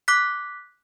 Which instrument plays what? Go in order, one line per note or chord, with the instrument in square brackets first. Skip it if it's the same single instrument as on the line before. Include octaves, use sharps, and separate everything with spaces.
[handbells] D6 F#6 B6